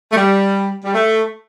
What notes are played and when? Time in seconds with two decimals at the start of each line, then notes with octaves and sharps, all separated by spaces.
0.12 A3
0.16 G3
0.84 G3
0.94 A3